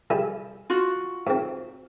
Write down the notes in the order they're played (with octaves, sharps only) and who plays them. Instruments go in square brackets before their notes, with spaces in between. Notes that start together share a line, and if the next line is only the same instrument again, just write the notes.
[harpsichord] G3 E4 G#4
[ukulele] F4 F#4
[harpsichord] G#2 C4